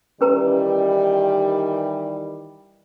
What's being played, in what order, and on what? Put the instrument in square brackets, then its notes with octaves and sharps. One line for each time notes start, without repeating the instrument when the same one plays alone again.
[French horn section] D#3 E3 G3 [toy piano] C#4 B4 A#5